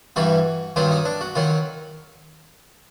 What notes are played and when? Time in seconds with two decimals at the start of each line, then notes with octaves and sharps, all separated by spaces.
0.16 G2 E3 G3 F#4
0.76 G2 D#3 F#3 F4
0.91 D#4
1.05 D4
1.21 F#4
1.35 D#3 F#3 F4